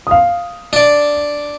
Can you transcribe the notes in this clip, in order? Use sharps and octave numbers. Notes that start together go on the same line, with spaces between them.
F5 D#6
D4 D5